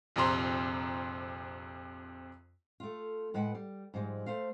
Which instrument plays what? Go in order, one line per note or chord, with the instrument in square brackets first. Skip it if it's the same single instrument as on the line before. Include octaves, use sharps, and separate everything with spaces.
[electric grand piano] A#1 F2 C3 A#5 C6
[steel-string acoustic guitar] A3 F4
A2 G#3 B4 F#5
G3
G#2 F3 G3 G#3
A3 C5 F5